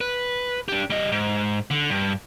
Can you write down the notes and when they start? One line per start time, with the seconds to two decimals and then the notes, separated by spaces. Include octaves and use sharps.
0.01 B4
0.68 D4 G4
0.90 G3 D#5
1.12 G#2
1.70 D3
1.90 G2